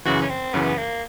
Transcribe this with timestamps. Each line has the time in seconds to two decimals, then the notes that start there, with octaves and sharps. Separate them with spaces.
0.05 F#2 C#3 E3 F#4
0.21 C#4
0.29 C4
0.54 F#2 C#3 E3 B3
0.77 A#3